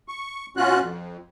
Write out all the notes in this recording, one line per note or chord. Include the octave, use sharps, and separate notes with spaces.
C#6
B2 C#4 F4 F#4 F#6
F2